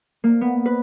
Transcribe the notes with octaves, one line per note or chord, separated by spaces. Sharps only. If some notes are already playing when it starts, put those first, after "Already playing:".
A#3
B3
B4